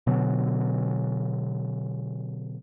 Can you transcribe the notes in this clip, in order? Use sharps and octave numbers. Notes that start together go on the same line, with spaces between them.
B2 D3 F#3